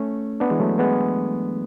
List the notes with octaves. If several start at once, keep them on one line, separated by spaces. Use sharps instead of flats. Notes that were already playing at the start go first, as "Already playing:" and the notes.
Already playing: A3 C#4
B3 D4
E3 G#3
F#3 A3
G#3 B3